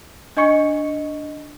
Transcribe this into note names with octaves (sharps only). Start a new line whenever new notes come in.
D4 D#5 G#5 C#6 C#7